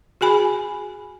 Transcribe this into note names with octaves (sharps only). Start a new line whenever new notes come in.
F#4 G#4 G#5 B5